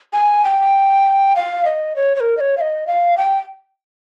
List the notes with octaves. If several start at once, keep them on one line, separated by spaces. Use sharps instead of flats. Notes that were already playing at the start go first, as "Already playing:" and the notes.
G#5
G5
F5
D#5
C#5
C#5
A#4
D#5
C#5
F5
D#5
F5
G5